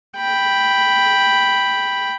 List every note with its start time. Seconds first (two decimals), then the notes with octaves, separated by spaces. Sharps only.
0.18 G5 B5